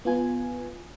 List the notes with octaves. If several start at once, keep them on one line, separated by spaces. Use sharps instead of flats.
B3 F4 G#5